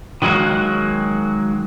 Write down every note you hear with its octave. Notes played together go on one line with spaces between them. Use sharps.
D#3 F#3 G#3 A#3 F#4